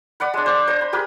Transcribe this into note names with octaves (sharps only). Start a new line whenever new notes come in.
B4 D5 F#5 B5
G#3 D4
C5 D6
C5 D#5 A#5
B5
G4 G#4 A#4 B4